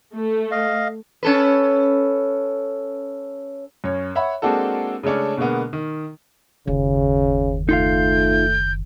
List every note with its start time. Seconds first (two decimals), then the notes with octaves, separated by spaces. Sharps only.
0.15 A3
0.51 D#5 F5
1.23 C#4 A4 B4
3.84 F#2 C#5
4.15 C#5 E5 F#5 B5
4.42 G#3 A#3 C4 D4 F#4 A4
5.03 C#3 G#3 A3 C#4 D4
5.37 B2 D3 G#3 A#3 B3
5.73 D#3
6.67 F#1 D#2 C#3
7.69 A3 D#4 F4 F5 G6